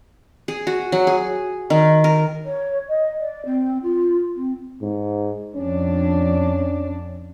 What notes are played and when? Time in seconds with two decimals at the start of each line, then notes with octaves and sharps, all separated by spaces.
0.48 G#4
0.67 F#4
0.92 F#3
1.07 G#4
1.70 D#3
2.04 A#4
2.45 C#5
2.88 D#5
3.18 D5
3.45 C4
3.83 F4
4.36 C4
4.82 G#2
5.56 F2 C#4 D4